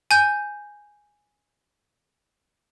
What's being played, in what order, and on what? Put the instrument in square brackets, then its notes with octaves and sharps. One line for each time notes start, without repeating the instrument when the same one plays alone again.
[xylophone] G#5 G6